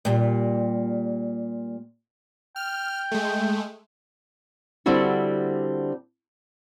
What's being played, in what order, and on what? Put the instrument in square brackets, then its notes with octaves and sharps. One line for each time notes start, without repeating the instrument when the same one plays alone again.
[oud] A#2 G3
[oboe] G5 [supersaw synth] F6
[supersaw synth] G#3 A3
[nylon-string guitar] D3 G3 C4 D4 E4 F#4